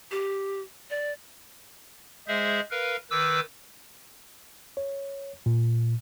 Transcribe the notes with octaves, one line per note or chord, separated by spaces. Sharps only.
G4
D5
G#3 G#4 C5 E5
A#4 B4 F5
D#3 B4 D6 E6
C#5
A#2